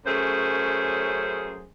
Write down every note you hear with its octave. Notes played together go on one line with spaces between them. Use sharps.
F#2 A3 C#4 G#4 C5